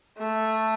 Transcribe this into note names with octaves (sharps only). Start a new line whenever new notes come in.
A3